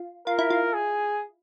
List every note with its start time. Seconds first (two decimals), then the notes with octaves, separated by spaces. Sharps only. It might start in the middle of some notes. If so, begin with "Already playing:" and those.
Already playing: F4
0.27 F4 A#4
0.39 E4
0.50 F4
0.74 G#4